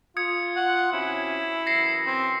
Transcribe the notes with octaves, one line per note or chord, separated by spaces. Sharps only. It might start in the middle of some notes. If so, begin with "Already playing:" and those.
F4 D#6 G#6 C#7
F#5
C3 C#4 E4 F#4
F#2 E3 F#3 A#6 C7 C#7
C4